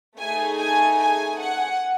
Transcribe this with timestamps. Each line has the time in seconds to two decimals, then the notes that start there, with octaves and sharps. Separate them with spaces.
0.19 A3 D#4 G#4 G#5
0.60 G#5
1.00 G#5
1.40 F#5